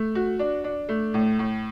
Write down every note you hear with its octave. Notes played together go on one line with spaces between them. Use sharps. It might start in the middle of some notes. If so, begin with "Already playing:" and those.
Already playing: A3
F#4
D4
D4
A3
A2
A2